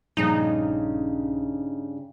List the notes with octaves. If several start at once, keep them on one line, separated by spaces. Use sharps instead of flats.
A#1 G2 C#3 C#4 D#4